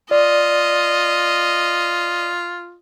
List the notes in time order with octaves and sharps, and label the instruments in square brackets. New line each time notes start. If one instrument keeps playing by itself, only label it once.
[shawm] F4 [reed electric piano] D5 [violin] D#5